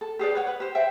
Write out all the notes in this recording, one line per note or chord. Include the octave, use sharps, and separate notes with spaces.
A4
G4 G#4 B4 D5
B4 C#5 F#5
B4
G4 C5
C5 E5 G5